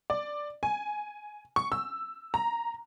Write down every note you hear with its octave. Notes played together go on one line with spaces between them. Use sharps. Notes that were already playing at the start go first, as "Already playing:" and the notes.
D5
G#5
C#6
E6
A#5